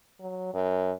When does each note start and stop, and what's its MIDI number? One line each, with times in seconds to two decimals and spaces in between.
0.20 0.51 54
0.54 0.92 42